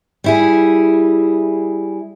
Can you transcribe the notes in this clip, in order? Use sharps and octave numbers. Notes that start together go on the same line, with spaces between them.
G3 E4 G#4